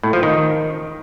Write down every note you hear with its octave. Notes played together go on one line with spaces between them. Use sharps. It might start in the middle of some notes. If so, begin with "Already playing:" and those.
A2
F3
D#3